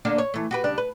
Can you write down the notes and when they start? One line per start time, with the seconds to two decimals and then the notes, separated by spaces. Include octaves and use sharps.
0.05 D3 A#3 D4
0.18 C#5
0.34 E3 A3
0.51 F#4 G4 B4
0.64 C#3 G3 D4
0.78 B4